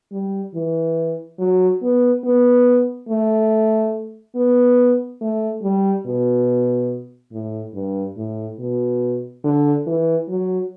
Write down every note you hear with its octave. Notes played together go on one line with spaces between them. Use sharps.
G3
E3
F#3
B3
B3
A3
B3
A3
G3
B2
A2
G2
A2
B2
D3
E3
F#3